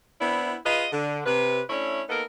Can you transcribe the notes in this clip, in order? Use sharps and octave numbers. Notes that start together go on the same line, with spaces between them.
B3 C4 D4 E4
F4 G#4 B4 D#5
D3
C3 B4
A3 C#4 D4 E4 C#5
A#3 B3 D#4 A4 A#4